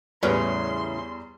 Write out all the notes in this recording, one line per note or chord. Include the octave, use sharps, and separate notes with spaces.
E2 A2 C#3 G3 B4 C#5 C6 F6